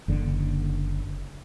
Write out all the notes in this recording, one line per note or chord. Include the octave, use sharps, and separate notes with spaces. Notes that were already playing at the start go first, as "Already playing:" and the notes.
F#1 D3